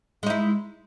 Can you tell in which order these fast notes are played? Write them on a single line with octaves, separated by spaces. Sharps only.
G#3 D#4 E4